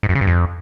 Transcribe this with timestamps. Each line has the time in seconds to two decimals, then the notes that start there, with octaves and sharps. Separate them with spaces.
0.03 G#2
0.09 F#2
0.15 C#3
0.21 G2
0.27 F2